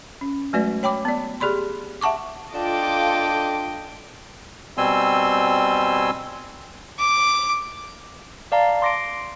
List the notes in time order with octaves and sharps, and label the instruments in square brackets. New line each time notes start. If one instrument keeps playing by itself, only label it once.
[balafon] C#4
F#3 G#3 A3 F#4 B4 D5
C#5 G5 B5 D6
B3 D5
G4 G#4 D5 B5 C6
E5 F#5 A5 C#6 D6
[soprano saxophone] D4 [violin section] F4 A4 D6 [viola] D#5 G5
[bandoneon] B2 G3 C4 G#5 C6 E6
[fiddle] D6
[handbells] D5 F5 A5 A#5
C6 D6 A#6 C7 D7